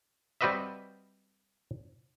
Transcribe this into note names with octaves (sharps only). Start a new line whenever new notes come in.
G3 C4 F#4 B4 D#5 E5